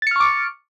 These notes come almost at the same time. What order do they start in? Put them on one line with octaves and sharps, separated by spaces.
A6 C#7 F6 C#6 D6